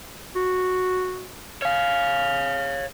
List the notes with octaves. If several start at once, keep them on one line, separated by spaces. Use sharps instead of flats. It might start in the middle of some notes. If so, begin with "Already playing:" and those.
F#4
C#5 F5 F6